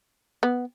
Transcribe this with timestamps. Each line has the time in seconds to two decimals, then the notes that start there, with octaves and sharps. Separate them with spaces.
0.43 B3